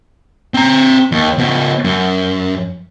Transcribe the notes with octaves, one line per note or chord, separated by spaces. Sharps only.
C4 A#5
D#2
C#3 B3
F#2